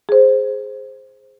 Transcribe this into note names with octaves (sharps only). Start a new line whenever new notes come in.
G#4 C5